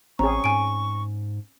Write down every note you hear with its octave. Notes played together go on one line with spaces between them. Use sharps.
A1 C4 C#4 G#4 A#5 C#6
G#2 G#5 D7